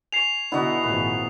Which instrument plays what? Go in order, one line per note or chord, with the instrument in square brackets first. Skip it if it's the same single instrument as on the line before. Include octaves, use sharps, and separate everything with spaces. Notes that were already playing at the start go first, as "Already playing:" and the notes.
[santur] G#5 C#6 [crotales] C7 F7
[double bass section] B2 D3 [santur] B3 D#4 F#4 [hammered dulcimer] E4 D#5
[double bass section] G#1 A#2 F3 [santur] G#4 B4